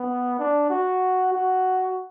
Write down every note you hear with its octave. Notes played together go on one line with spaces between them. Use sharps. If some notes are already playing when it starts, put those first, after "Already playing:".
Already playing: B3
D4
F#4
F#4